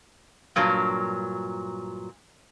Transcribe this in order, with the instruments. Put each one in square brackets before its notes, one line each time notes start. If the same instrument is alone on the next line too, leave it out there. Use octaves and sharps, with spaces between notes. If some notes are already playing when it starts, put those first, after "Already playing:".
[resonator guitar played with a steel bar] G2 A#2 F#3